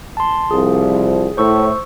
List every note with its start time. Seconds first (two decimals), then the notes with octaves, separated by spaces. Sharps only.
0.17 A5 C6
0.51 C2 F3 G#4
1.37 A2 C5 C#6 E6